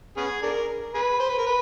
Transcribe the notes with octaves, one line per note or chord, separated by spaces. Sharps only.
B3 C#4 G#4
D4 A#4
G#4 B4
C5
B4
A#4
B4